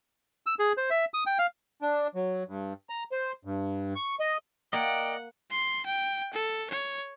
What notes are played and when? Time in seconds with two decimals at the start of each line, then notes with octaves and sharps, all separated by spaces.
0.46 E6
0.59 G#4
0.77 C5
0.90 E5
1.14 D#6
1.26 G5
1.39 F5
1.82 D4
2.15 F#3
2.48 G2
2.89 A#5
3.12 C5
3.45 G2
3.95 C#6
4.20 D#5
4.73 A#3 A#4 D5 D#5 F#5 G5
5.51 C6
5.86 G5
6.33 A4
6.71 C#5